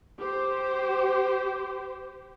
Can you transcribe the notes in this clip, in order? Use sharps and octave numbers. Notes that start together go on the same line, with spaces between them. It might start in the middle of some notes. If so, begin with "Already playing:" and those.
G4 C5